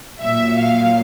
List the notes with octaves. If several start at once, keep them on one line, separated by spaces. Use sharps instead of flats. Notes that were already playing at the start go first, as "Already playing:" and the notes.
A#2 F#3 E5
F5